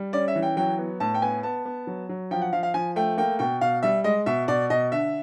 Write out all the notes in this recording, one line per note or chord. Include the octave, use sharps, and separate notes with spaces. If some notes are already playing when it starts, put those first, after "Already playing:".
Already playing: G3
C#4 D5
E5
E3
G5
F#3 G5
B3
A2 A5
G5
B3 G#5
B3 A5
B3
F#3
F#3
F3 G5
F#5
F3 F5
F5
F3 G#5
A3 G5
A#3 G5
B2 G5
B2 F5
G3 E5
G#3 D#5
B2 E5
B2 D5
B2 D#5
D3 E5